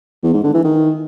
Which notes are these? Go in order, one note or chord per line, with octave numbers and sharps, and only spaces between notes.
E2
G#2
D3
E3
D#3